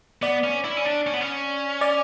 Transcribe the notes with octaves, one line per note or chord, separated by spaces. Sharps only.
B3 D5
C#4
E4
C#4
D4
C#4
B3
C#4
D5